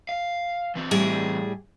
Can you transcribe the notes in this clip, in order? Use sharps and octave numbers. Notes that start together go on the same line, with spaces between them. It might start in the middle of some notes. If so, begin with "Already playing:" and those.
F5
E3 C4
A2 G3 G#4